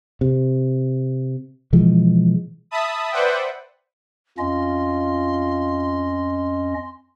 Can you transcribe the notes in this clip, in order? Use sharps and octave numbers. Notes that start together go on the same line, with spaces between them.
C3
B2 E3 F3 G#3
E5 A5 B5 D#6
B4 C5 D5 E5 F#5 G5
F2 C#4 F4 D#5 C6